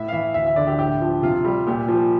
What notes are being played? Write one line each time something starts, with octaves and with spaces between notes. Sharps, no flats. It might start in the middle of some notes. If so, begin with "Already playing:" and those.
Already playing: A2 E5
F5
E3 E5
D2 E5
E5
D3 D5
G4
A2 G4
F3
C3 F4
G3
A#2 G4
F3